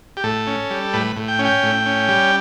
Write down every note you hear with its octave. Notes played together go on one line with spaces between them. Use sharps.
G4
A2 A4
C#4
G3
A2 B4
A2
G5
C#4
G5
A2
C#4
G3